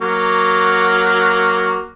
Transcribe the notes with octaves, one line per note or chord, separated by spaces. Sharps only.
F#3 A#3 F#4